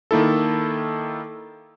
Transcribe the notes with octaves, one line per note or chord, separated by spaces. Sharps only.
D#3 A#3 E4 A4